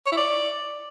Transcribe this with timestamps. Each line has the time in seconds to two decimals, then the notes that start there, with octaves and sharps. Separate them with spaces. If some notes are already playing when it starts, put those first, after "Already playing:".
0.06 C#5
0.12 E4
0.17 D5